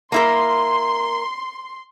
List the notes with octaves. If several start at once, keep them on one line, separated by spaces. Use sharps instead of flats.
A#3 E4 A#4 C6